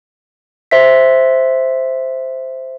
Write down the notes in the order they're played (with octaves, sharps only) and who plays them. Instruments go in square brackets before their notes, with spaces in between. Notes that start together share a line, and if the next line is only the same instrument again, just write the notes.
[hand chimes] C5 E5 B6